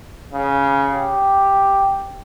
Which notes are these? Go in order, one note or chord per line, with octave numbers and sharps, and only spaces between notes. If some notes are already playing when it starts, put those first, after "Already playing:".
C#3
G4